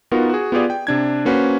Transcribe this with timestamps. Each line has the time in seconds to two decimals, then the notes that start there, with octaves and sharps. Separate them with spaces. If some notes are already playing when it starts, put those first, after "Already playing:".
0.11 B3 D#4 F4 F#4 A#4
0.29 F#4 G#4
0.52 B3 F4 G4 G#4 D5
0.70 G5
0.87 C3 D4 G#6
1.25 A#3 C#4 F#4 B4 C5